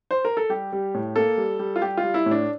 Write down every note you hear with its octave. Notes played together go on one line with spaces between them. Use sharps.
C5
A#4
A4
G3 G4
G3
A2
A#3 A4
G3
G3
F4
G3 G4
F4
G3
E4
A2
D4